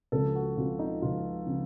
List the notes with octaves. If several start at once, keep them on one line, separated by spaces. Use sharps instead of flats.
C#2 C#3 F3 A4
F#4
C#2 C#3 F3 F4
D#4
C#2 C#3 F3 F4
C#3 F3